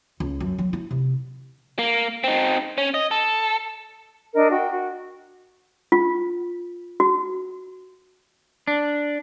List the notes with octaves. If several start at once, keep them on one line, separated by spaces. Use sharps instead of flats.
C#2
F#2
F#3
E4
C3
A#3
C4 D#4
C#4
D#5
A4
D4 A#4 D#5
F#4 G5
F#4
F4
F#4
D4